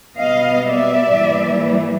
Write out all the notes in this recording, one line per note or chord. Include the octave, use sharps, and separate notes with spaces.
B2 G3 B3 D#5 F5
D5 E5
G#2 E3 G3 A#3